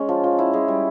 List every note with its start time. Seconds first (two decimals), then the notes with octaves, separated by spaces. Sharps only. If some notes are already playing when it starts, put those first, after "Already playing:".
Already playing: G#3 C#4
0.09 F3
0.24 F3
0.39 E4
0.53 G#3
0.68 G3